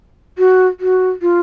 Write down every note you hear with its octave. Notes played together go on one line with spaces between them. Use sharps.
F#4
F#4
F4